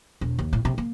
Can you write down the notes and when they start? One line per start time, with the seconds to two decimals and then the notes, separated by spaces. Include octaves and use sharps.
0.21 E1
0.39 D#2
0.53 A2
0.65 C3
0.78 A#3